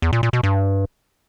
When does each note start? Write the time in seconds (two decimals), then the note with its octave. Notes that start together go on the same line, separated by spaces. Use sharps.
0.02 E2
0.13 A#2
0.23 A#2
0.33 B2
0.43 G2